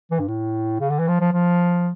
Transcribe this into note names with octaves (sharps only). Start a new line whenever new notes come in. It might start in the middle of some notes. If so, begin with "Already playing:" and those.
E3
G2
A2
C#3
D3
E3
F3
F3
F3